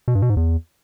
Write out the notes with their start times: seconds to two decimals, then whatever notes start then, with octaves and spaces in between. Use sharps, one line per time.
0.08 B2
0.15 G2
0.22 B2
0.29 G#2
0.37 E2